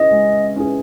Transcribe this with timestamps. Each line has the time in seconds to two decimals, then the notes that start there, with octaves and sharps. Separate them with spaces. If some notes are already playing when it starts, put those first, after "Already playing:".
Already playing: C#4 E4 G#4 B4 D#5
0.11 G#3
0.56 C#4 E4 G#4 B4